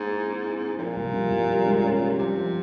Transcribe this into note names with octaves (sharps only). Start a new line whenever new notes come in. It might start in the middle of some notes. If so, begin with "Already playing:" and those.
Already playing: G#2 A#3
E4
C4
E4
C4
A#2 F3
C2
C3
C2
G3
G#2
C#4
G3
C3 F3
F3